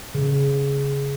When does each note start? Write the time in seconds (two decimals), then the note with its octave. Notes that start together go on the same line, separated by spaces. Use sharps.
0.15 C#3